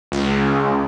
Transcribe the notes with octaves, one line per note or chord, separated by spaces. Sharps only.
C#2